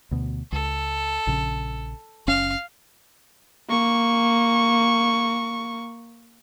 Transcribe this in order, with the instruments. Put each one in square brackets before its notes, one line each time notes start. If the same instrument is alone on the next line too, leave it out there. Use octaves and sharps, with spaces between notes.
[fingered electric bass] D2 B2
[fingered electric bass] C#2 [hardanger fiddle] A4
[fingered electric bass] A#1 C#3
[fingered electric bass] F#1 C#4 [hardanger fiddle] F5
[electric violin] A#3 C#6